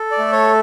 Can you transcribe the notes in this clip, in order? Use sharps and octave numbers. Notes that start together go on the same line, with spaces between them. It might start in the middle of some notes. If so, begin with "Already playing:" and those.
Already playing: A4
D5
A3
C#5